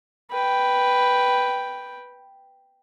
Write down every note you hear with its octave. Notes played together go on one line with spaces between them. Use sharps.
B4 G5